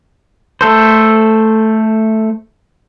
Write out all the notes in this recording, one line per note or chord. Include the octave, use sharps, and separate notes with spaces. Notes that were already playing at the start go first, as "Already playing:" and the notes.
A3 A4 C5